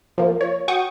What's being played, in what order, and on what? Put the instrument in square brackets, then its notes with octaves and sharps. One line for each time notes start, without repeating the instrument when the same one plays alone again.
[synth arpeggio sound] F3 A#3
C#5
F#4 G5 C#6 D#6